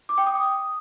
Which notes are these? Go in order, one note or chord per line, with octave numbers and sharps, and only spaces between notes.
D6
G5
D#6